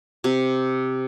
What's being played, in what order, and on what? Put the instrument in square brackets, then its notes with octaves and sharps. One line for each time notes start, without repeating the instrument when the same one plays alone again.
[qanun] C3